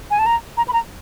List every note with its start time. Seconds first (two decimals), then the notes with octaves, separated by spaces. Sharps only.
0.11 G#5
0.19 A5
0.26 A#5
0.57 A#5
0.68 B5
0.73 A#5